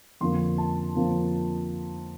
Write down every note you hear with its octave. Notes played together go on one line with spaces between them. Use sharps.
F2 D3 F3 A#3 C6
A5
F2 D3 F3 A#3